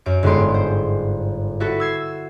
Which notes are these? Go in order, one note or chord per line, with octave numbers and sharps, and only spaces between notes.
F#2 D7
G1 G#2 G#3 B3 C6 D7
C5
E4 F#4 A4 B4
E6 G#6 C7